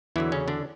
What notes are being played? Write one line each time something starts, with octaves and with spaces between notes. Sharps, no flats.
E2 D3 E3 F#3 E4
C#3 C#4
D3 D4